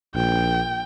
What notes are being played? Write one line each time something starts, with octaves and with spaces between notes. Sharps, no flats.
A#1 G5